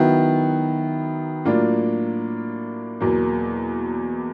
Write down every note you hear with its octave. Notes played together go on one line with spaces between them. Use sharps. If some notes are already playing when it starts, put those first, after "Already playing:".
Already playing: D#3 F#3 B3 E4
A2 F#3 A#3 D4 F4
E2 B2 F#3 A#3